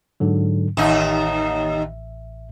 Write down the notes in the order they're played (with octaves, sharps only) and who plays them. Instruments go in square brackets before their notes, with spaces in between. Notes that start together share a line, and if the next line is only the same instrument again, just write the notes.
[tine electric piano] G#2 D3 F#3
[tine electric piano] A1 E5 [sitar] D#2 D#4